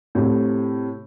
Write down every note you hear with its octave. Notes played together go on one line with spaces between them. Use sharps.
A2 C3